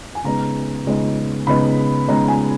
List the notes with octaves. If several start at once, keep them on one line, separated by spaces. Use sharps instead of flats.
G#5
C#3 G#3 B3 D#4 A#5
C#3 G#3 B3 D#4
C#3 G#3 B3 D#4 B5
C#3 G#3 B3 D#4 A#5
G#5